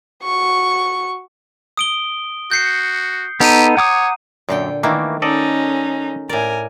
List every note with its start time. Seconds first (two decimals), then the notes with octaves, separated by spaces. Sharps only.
0.24 F#4 C#6
1.77 D#6 D7 G7
2.51 F#4 G6 C7 C#7
3.40 B3 D#4 G4 A4 A#5 D#7
3.77 C#5 F#5 D6 D#6
4.49 F#2 A#2 D3 G5
4.83 D#3 E3 A3 A#3
5.22 C#4 D#4 A4 D5 D#5
6.29 A2 A#4 D5 G#5